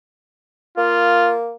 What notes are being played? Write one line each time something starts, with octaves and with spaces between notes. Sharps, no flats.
A#3 F4